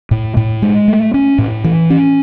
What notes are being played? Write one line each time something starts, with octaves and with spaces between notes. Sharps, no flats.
A2
A2
G#3
A3
C#4
A2
E3
C#4